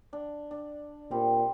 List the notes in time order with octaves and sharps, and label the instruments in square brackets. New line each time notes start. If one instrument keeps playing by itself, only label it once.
[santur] D4
D4
[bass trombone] A#2 [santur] G3 C4